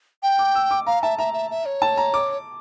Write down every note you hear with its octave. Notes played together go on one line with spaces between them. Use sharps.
G5
D6
E6
D6
F5 A#5
E5 A5
E5 A#5
E5
E5
C#5
A5
A#5
D6